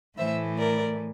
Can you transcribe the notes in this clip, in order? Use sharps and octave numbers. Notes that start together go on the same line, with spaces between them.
A2 E3 A3 C5 E5
A#4 D5